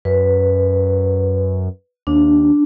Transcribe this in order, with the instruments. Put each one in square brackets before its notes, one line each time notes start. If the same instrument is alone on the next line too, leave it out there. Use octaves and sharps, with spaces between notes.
[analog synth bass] F#2 [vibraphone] B4
[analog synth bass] D#2 [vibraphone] D4